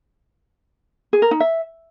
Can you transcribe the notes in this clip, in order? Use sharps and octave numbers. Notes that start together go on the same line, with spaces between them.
G#4
A#4
D#4
E5